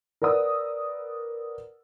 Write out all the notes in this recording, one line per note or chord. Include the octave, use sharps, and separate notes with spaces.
A#4 B4 D5 F#5 D#6 E6